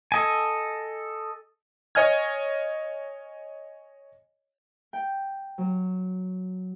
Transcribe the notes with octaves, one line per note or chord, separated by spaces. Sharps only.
A4 D#5 G#5
C#5 D#5 G#5 F6 G#6
G5
F#3